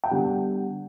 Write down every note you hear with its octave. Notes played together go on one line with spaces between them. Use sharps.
G5
D3 G3 B3 F#5